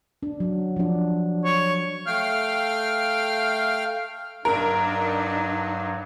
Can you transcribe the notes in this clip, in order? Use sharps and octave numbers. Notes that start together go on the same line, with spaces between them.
D4
F#3
F3 D4
C#5
A3 F5 G5 F6
G2 F#3 D4 D#4 A#4